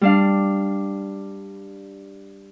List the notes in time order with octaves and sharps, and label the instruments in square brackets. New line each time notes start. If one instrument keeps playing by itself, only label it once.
[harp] G3 D4 F5